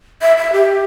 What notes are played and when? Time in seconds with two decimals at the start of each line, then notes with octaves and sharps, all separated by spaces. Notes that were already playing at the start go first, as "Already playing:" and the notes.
0.22 E5
0.37 E5
0.53 G4